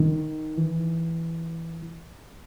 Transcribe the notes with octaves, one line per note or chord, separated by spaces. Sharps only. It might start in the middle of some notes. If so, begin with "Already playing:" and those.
Already playing: D#3
E3